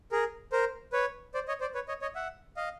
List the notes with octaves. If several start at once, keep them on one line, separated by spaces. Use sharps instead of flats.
G#4 A#4
A#4 C5
B4 C#5
C5 D5
C#5 D#5
C5 D5
B4 C#5
C#5 D#5
C#5 D#5
E5 F#5
D#5 F5